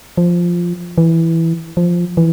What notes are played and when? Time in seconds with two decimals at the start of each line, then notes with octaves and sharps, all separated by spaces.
0.18 F3
0.98 E3
1.77 F3
2.17 E3